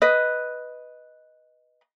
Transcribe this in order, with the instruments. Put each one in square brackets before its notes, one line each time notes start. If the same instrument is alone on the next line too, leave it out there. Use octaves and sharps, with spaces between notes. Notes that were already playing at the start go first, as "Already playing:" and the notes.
[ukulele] B4 D#5